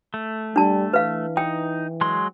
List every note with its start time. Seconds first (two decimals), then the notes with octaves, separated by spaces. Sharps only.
0.14 A3
0.56 G3 D4 A5
0.93 E3 B4 F5
1.37 D#4 G5
2.01 F#3 G#3 C6